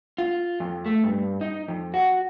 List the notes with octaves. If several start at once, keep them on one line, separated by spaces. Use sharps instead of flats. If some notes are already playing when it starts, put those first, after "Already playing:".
F4
F2
A3
G2
D#4
F2
F#4